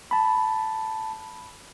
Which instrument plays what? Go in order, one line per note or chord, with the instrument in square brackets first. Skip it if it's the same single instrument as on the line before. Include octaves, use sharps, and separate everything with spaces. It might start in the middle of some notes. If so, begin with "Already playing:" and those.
[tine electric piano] A5 B5